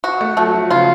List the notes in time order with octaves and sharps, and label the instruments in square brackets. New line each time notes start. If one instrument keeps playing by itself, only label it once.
[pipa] F#4
[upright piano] A3
[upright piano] F#3 [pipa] A3
[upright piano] F3
[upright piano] C#3 [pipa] F4